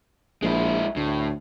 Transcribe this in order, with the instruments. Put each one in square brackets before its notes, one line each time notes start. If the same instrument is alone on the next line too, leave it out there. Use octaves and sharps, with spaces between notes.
[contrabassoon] A#1 [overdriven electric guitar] G#3 E4
[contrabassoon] D2 [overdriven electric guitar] A2